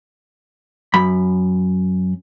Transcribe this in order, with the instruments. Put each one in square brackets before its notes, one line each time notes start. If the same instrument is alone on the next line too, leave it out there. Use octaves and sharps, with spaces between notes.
[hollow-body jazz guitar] F#2 B5